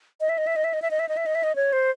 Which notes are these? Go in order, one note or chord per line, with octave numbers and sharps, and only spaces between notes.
D#5
E5
D#5
E5
D#5
E5
D#5
E5
D#5
E5
D#5
E5
D#5
E5
D#5
C#5
C5